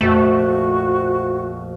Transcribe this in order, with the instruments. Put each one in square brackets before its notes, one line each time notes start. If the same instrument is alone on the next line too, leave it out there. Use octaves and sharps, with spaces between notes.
[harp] A#1 F2 [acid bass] A3 [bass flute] F#4